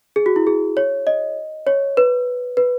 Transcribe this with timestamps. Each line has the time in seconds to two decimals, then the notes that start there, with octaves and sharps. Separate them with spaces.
0.16 G#4
0.26 F#4
0.36 E4
0.47 G#4
0.77 C#5
1.07 D#5
1.67 C#5
1.97 B4
2.57 B4